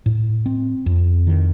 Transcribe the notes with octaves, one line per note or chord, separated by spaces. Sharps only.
A2
C4
F2
D#3